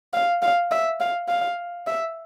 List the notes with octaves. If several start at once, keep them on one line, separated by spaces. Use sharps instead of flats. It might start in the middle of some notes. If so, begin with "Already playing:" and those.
F5
F5
E5
F5
F5
E5